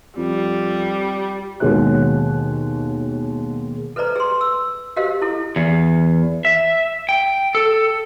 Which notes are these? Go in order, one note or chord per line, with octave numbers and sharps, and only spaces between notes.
F2 G3
D#2 B2 G#3 F#4 C#5 F#6
A4 B4 C5 D5 A#5
G#4 C6
E6
F#4 G4 A#4 C5 D#5 F5
E4 A4
E2
E5
G5
A4